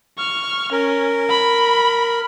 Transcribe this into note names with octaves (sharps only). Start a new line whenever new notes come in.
C#6 F6
C#4 A#4
B5